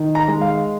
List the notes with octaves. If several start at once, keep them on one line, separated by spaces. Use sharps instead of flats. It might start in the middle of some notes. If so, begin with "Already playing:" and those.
Already playing: D#3
A#5
G#3
F5